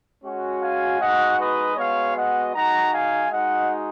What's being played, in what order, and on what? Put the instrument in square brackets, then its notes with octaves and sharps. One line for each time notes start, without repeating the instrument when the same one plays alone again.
[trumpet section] G#3 C#4 F#4
F5 G#5
G#3 D#4 F#4 D#5 F#5
B4 D#5
G#3 B3 F#4 C#5 F5
D#5 F#5
G#3 D#4 F#4 F#5 A#5
F5 G#5
G#3 D#4 F#4 D#5 F#5